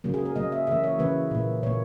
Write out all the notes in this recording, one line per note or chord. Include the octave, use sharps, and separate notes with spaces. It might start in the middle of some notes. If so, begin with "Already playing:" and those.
C#3 F#3 A#3
G#4
A#4
C#3 F#3 A#3 D#5
E5
C#3 E3 A#3 E5
C#5
C#3 E3 A#3 B4
A#2 A#3
A#2 A#3 C#5